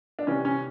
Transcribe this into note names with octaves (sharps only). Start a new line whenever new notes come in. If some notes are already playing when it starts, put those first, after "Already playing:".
D4
C3 E3 C#4
C#4